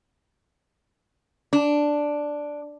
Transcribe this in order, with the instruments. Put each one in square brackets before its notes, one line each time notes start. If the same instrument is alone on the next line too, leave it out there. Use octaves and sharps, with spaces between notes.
[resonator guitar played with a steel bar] D4